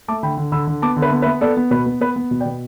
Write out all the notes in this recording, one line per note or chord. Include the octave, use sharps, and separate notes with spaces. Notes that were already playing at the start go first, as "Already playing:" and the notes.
A3 A5 D6
D3 G5 B5
D3
D3 B5 E6
D3
B3 A5 D6
D3
B4 E5
B3
B4 E5
B3
B3 A4 D5
B3
B2 B4
B3
B3 B4
B3
B2
D5 G5
B2